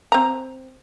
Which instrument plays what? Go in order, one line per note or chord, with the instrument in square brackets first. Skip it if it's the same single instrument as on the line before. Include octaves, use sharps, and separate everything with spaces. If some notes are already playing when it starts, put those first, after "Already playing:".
[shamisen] C4 A#5